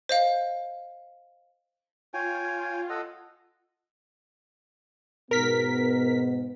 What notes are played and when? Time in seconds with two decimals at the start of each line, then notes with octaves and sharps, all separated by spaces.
0.09 C5 D#5 F5
2.14 F4 C#5 G5 G#5
2.90 A4 D#5 F#5
5.31 G#2 B2 B3 A#4 B6